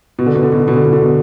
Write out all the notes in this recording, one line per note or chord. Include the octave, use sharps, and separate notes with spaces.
B2
D3
B2
D3
B2
D3
B2
D3
B2
D3
B2